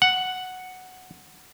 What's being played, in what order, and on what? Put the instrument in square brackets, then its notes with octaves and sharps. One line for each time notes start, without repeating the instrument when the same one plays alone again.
[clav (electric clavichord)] F#5